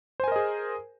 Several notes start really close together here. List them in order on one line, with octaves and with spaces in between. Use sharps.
C5 G#5 A#4 D#5 G#4